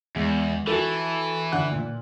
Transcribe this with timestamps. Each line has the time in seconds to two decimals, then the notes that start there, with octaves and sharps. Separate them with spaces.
0.16 E2 G#3
0.67 E3 F#4 A4
1.52 D3 F#5 F#6
1.71 A#2